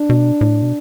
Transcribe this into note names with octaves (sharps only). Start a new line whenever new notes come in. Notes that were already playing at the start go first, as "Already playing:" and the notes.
Already playing: D4
B2
A2
B2